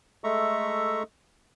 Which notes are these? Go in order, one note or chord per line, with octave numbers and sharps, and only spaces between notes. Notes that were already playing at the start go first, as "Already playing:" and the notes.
G#3 A3 A4 E5 A#5 C#6